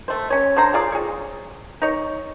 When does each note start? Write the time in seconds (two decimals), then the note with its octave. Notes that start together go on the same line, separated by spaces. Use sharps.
0.08 A3 C5
0.30 C#4 C#5
0.56 D3 D4 C5 A#5
0.74 F4 G#4 D5 F5
0.92 G#4 C#5
1.82 D#4 C#5